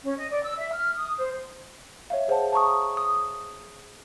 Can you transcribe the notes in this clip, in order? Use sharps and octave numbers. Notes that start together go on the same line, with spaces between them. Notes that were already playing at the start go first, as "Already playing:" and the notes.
C#4
D#5
D5
E6
E5
F6
D#6
C5
C#5 E5 F5
G#4 C5 C#5 F#5 A5
A5 A#5 C#6 D#6
D#6